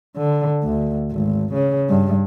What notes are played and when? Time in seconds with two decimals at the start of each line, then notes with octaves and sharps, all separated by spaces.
0.17 D3
0.64 D2
1.12 G#1
1.54 C#3
1.90 G2